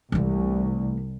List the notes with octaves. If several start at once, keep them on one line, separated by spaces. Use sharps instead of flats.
C2 E3 A3